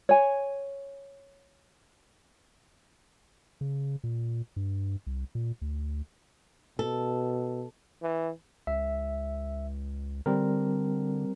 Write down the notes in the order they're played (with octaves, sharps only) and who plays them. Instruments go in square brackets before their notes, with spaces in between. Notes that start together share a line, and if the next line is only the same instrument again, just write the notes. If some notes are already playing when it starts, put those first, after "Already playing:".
[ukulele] C#5 G#5
[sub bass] C#3
A#2
G2
C2
A#2
D2
[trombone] B2 [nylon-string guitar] A4
[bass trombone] E3
[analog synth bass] C#2 [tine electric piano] E5
[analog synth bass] D3 [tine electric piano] G3 C4 A#4